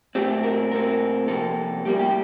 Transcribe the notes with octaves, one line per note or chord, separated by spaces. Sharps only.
A#2 A3 C4 G4
A#4
A#2 A3 C4 A#4
C3 F3 A#3 A4
A2 G3 A#3 G4
G4